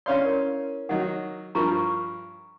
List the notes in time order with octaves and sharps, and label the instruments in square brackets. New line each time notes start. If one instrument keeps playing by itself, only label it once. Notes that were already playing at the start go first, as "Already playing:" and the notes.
[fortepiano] C#4 F5 C6 [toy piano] E4 C#5 D5
[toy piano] A#4
[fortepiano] D#3 F#3 D#4 [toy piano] F#5
[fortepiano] G2 F3 A#4 [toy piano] A#5 C#6